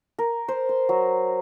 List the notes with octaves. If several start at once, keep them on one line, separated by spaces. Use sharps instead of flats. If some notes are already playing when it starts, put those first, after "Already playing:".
A#4
C5
C6
F#3